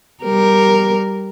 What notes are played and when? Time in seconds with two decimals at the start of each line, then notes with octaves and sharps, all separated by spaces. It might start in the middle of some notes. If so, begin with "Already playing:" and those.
0.24 G3 A#4